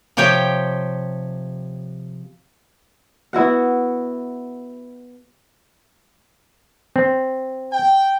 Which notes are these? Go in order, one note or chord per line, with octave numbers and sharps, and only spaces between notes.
C3 F3 G4 C#5 G5
B3 E4 F#4 F#5
C4
G5